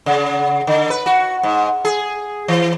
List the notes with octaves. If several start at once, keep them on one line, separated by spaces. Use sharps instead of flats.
C#3
D3
B4
F#4
G#2
G#4
E3